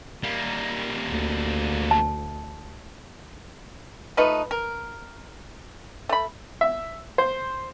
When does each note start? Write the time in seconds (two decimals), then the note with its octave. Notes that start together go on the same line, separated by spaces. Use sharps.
0.23 G3 A#3
1.10 D2
1.91 A5
4.17 F3 A3 D#4 B4
4.51 A#4
6.09 A3 B5
6.61 E5
7.18 C5